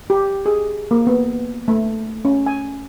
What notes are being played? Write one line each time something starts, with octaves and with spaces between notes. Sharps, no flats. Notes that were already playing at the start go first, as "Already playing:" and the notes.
G4
G#4
A#3
B3
A3
C#4
G#5